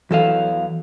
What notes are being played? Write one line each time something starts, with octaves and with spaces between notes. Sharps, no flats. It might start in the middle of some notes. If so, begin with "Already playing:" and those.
E2 E3 F#3 A4 D#5 F5